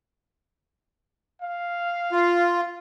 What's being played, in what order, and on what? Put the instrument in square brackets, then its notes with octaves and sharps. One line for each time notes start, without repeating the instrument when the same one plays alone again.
[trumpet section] F5
[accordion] F4